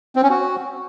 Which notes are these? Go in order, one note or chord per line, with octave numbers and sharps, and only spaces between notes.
C4
C#4
F#4